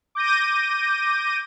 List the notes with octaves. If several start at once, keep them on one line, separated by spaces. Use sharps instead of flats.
D6 G6 A#6 D#7